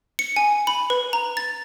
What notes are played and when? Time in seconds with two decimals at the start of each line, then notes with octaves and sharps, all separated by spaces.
0.19 C#7
0.36 G#5
0.67 B5
0.90 B4
1.13 A#5
1.37 A6